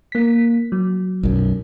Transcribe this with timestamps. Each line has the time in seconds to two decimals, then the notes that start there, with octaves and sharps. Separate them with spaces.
0.12 A#3 B6
0.72 F#3
1.23 B1 F#2